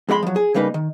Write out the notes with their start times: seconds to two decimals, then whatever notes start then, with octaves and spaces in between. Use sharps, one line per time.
0.09 F2 G#3 F4 B5 C6
0.23 F3 F#3
0.36 G#4
0.54 C#3 G3 A#3 D#4 B4
0.74 D#3